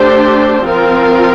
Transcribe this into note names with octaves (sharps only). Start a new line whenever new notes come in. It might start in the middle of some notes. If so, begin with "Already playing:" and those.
Already playing: A3 D4 G4 C5
F3 C4 F4 A#4